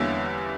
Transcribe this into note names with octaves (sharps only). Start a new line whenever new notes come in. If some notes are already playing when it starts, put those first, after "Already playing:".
Already playing: E2 D3 G3 A#3 C#4 E4